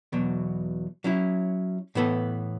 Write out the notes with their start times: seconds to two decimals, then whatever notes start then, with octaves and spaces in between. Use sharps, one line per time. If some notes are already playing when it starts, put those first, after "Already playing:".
0.12 E2 B2 F#3
1.04 F#3 C#4 E4
1.95 A2 E3 B3 A4